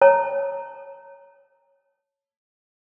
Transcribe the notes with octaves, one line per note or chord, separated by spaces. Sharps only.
C#5 A5 A#5